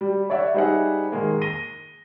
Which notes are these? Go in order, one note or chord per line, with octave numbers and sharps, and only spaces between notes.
G3
C#5 D5 E5 F#5
G3 D#4 G#4 C5 E5 F#5
G#2 D#3 G#3 A#3
A#6 D#7 G7